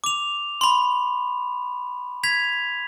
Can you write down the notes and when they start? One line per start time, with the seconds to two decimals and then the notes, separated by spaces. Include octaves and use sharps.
0.04 D6 F7
0.61 B5 C6
2.23 G#6 B6 F7